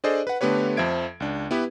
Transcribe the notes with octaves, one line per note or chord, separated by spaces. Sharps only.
D4 G#4 A4 C5 D5 D#5
B4 F#5
D3 A3 B3 G4 B4 C#5
F2 F3 C5 E5 G#6 D7
C#2 D4
B3 E4 G4 B4